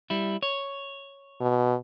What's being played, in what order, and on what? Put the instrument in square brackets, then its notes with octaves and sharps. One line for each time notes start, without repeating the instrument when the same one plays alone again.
[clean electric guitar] G3 E4
C#5
[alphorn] B2